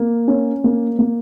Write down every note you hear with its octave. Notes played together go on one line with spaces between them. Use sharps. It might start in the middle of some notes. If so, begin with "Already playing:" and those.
Already playing: A#3
C#4
A#3
A#3